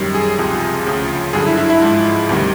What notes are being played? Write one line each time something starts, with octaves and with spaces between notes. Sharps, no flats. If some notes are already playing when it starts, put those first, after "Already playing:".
Already playing: F#2 D#3 G3
G#4
C#2 C3 F3
D2 C#3 F3
G2 D3 F#3 G#4
E4
E4
E4
G#2 F3 G#3
D2 C3 D#3 G3